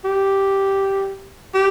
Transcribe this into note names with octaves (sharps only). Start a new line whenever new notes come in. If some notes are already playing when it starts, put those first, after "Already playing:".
G4
G4